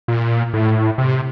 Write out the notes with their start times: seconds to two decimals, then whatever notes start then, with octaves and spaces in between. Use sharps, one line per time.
0.08 A#2
0.53 A2
0.98 C3